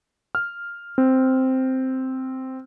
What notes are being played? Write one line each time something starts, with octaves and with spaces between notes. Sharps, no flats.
F6
C4